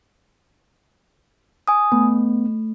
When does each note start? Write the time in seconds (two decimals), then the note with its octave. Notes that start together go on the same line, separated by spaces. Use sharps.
1.68 G#5 D#6
1.92 A3 B3